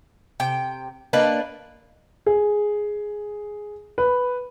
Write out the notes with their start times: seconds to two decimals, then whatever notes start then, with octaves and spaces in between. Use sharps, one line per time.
0.40 C3 G5
1.13 A#3 D4 B4 D#5
2.26 G#4
3.98 B4